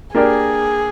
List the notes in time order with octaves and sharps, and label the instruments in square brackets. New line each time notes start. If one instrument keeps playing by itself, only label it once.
[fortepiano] A#3 D4 G4 A#4 D5 [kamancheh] G#4